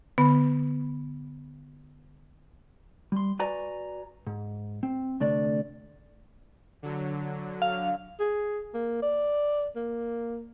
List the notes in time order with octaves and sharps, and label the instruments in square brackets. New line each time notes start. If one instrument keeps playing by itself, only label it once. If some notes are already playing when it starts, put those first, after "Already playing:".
[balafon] D3 [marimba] B3
[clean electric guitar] G3 C6
F#4 B4 D5 G#5 A#5
G#2
C4
D2 C3 A3 D4 D5
[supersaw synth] D3 F#3
[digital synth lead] F5
[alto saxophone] G#4
A#3
D5
A#3